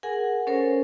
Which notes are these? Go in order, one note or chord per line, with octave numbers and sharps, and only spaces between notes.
G#4 A#4 F#5 G#5
C#4 A4 A#4 C5 C#5